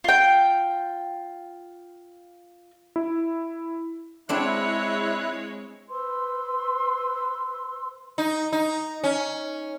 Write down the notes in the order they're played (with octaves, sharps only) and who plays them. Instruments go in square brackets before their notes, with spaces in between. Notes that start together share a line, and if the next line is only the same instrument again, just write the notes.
[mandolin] F4 G5
[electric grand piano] E4
[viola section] G#3 C#5 [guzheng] C4 D4 F#5 [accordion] E4 F#6
[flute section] B4 C5 C6 E6
[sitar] D#4
D#4
C#4